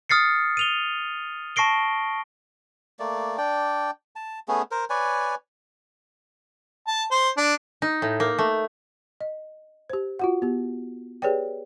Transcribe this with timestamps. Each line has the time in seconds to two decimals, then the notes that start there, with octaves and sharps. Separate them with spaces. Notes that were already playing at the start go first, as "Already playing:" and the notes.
0.09 D#6 F6 A6 C7 C#7
0.57 D#7 F7 G7
1.56 A5 C#6 A#6 C7 D7 G7
2.99 A3 A#3 D5
3.38 D4 D5 G5
4.16 A5
4.48 A3 B3 C#4 G#4
4.71 A#4 C5
4.90 B4 C#5 D5 G#5
6.88 A5
7.11 C5
7.37 D4
7.82 D#4
8.02 A2
8.20 A#3
8.38 A3
9.21 D#5
9.90 G4 C5
10.19 F4 F#4 F#5
10.42 B3 G4
11.22 G4 G#4 B4 C#5 D5 G5